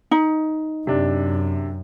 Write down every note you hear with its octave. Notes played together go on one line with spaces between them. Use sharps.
D#4
F#2 C3 D4